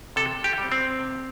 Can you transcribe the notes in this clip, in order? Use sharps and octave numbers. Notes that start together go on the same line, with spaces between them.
C3 A4
G4
G3 C4
C4
C3